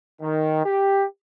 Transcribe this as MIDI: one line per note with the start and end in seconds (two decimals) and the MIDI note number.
0.21 0.65 51
0.65 1.05 67